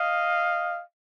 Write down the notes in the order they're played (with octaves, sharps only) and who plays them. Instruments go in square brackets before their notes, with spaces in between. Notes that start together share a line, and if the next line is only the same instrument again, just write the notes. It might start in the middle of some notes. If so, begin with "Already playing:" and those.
Already playing: [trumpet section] D#5 F5